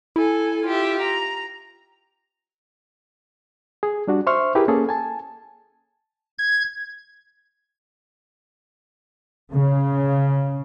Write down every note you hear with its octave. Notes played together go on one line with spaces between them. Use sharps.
E4 A4 G#5
F4 G4 E5
A#5
G#4
G3 D4 F#4
C5 E5 C6 C#6 F6
E4 G4 G#4 A#4 B4
A#3 C#4 G#4 A4
G#5 A5
G#6
C#3